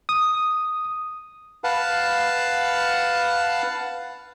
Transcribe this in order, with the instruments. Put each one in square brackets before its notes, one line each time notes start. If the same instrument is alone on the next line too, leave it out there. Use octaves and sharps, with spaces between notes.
[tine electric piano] D#6
[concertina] B4 F5 F#5 A5